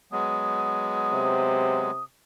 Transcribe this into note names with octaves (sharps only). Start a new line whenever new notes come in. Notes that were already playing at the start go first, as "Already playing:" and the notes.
F#3 G#3 B3 D#6
C3